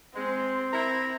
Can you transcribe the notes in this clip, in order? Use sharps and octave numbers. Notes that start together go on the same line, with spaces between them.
G#3 C4
E4 A#5